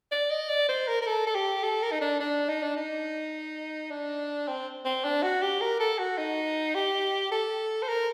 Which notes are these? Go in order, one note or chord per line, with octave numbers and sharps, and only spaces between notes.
D5
D#5
D5
C5
A#4
A#4
A4
A4
G4
A4
A#4
D#4
D4
D4
D#4
D4
D#4
D4
C4
C4
D4
F#4
G4
A#4
A4
F#4
D#4
G4
A4
C5
A#4